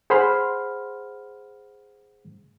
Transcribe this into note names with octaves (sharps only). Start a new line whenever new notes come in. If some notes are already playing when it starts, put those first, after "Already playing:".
G#4 C5 F#5 B5 C6 F6